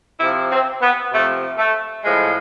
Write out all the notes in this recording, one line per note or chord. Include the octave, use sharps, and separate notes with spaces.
C3 F3 E4
C4
B3
C3 F3 A3
A3
A2 F3 G#3